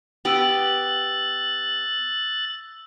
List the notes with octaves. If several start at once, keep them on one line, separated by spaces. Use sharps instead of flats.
B3 G4 E6 F#6 A6 F#7